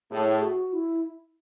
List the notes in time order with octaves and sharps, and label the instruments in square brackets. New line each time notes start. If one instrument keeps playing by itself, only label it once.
[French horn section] A2 [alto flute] G#4
[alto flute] F#4
E4